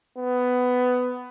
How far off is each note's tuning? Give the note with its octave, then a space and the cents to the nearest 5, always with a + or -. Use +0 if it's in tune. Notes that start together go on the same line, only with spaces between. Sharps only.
B3 +15